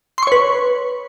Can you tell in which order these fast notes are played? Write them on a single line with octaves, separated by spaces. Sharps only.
C6 C#6 C#5 B4